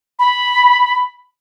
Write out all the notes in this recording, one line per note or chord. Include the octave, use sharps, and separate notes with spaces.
B5